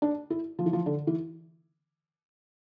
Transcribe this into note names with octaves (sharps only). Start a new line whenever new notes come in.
D4
E4
F3
E3
F3
D3
E3